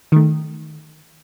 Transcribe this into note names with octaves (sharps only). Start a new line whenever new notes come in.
D#3 A3